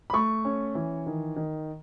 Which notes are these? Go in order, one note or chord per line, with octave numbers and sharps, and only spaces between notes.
B5
A3 C#6
C#4
E3
D#3
D#3